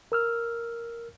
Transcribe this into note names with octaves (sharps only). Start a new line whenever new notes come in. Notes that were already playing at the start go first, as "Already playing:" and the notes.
A#4 E6 F6